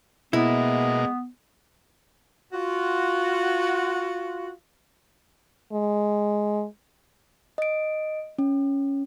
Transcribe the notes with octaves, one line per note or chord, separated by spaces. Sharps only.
B2 G#3 A#3 B3 E4
F4 F#4
G#3
D#5 D7
C#4